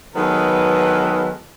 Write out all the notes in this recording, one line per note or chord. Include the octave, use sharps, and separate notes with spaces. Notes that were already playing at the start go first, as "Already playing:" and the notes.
D#3 F#3 G#3 B3 A4 B4